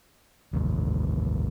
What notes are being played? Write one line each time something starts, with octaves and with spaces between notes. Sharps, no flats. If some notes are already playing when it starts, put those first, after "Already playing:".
A1 D#2